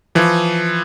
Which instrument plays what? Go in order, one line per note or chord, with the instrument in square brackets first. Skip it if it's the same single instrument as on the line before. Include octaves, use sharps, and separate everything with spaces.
[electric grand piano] E3 F3